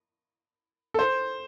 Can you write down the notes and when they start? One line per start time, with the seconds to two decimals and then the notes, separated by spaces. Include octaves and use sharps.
0.94 A4
0.99 C5